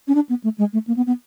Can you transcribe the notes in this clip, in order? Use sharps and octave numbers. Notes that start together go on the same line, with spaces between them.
C#4
D4
B3
A3
G#3
A3
A#3
B3
B3